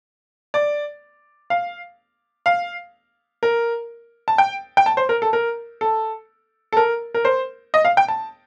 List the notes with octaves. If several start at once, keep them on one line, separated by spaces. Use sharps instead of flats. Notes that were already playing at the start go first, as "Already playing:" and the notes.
D5
F5
F5
A#4
A5
G5
G5
A5
C5
A#4
A4
A#4
A4
A4
A#4
A#4
C5
D#5
F5
G5
A5